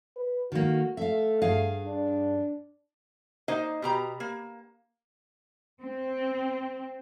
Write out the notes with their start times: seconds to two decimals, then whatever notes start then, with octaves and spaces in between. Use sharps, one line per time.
0.16 B4
0.52 D#3 A#3 F#4
0.97 A3 E5 F5
1.42 G2 G#4 F5
1.86 D4
3.48 A#3 D#4 C5 D#5
3.82 B2 G4 A#5
4.20 A#3
5.84 C4